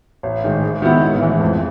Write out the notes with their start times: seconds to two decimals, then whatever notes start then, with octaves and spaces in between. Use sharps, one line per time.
0.23 A1
0.44 G#2 D#3 G#3
0.63 G#2
0.82 D#3 G#3 B3 E4
1.02 A1
1.21 G#2 E3
1.41 F2